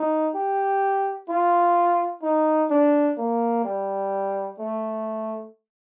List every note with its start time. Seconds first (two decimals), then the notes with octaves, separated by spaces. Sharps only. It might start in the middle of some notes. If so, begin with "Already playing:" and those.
Already playing: D#4
0.35 G4
1.29 F4
2.22 D#4
2.70 D4
3.18 A#3
3.65 G3
4.59 A3